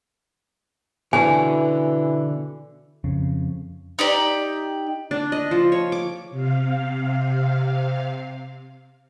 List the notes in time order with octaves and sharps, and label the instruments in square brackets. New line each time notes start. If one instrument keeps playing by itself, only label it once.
[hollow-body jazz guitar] B2 D3 C#4 [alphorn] E3 [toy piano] G#5
[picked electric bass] F2 C#3
[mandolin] D#4 G4 D5
[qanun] D4
D#5
F3
C#5
D6
[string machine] C3 F5